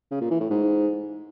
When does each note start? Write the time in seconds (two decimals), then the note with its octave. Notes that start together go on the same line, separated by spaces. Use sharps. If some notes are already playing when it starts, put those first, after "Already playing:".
0.11 C#3
0.21 A#2
0.31 E3
0.40 A2
0.50 G#2